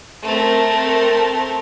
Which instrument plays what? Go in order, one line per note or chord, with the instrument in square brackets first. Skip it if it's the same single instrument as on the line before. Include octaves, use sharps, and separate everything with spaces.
[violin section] A3 C4 A#4